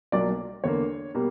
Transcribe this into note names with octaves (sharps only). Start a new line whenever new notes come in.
B1 B2 F#3 A#3 D5
E2 D3 A#3 C#5
B2 G3 A#3